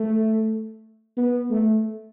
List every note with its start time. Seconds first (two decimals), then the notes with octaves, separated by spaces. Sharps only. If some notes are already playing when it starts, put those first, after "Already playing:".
Already playing: A3
1.17 B3
1.50 A3